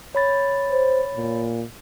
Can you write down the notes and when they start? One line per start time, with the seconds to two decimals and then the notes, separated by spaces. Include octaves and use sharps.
0.15 C#5 B5 A6
0.71 C5
1.16 A#2